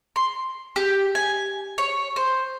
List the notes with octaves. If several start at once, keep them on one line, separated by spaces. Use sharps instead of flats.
C6
G4
G#5
C#5
C5